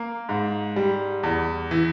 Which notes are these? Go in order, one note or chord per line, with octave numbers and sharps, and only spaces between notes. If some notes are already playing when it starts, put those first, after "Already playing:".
Already playing: A#3
G#2
G3
E2
E3